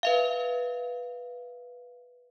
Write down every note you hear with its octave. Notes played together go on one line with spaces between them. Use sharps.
B4 E5 F5